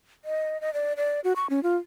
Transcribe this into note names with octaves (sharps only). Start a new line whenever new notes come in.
D#5
D#5
D5
D5
F#4
C#6
C#4
F4